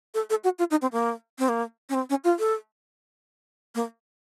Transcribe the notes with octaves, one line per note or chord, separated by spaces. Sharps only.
A4
A4
F#4
F4
D#4
C4
A#3
C4
A#3
C#4
C4
C#4
F4
A4
A#3